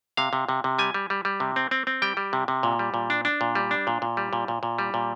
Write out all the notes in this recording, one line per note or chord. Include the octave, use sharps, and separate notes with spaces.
C3 F5
C3
C3
C3
G3 G#5
G3
G3
G3
C3
C4
C4
C4
G3 G5
G3
C3
C3
A#2
G3
A#2
D4
D4
A#2
G3
D4
A#2
A#2
G3
A#2
A#2
A#2
G3
A#2